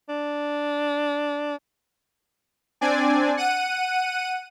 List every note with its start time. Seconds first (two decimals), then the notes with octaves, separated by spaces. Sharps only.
0.09 D4
2.81 C4 D4 D5 G#5
3.37 F#5 D#7